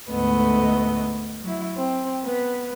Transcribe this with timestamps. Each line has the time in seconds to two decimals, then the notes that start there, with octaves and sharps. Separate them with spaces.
0.10 D2 G#2 A3 B3 D#5
1.43 F#3 E4
1.76 C4
2.23 B3 B4